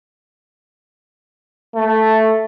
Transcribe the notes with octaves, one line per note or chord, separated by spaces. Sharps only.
A3